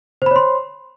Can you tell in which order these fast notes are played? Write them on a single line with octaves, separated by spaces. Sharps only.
C5 B5 C#5 C6